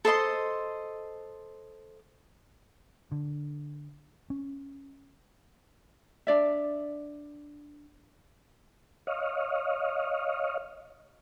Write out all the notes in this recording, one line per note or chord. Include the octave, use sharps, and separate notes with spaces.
A4 C5 D#5 C6
D3
C#4
D4 D5 E5
C#5 D#5 F5